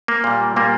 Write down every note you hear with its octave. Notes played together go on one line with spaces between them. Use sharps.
A#3
A#2 G3
A#2 G3 A#3